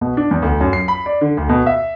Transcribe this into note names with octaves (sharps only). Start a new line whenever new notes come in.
B2
D4
E2
D2
F#2
C7
B5
D5
D3
D2
B2
E5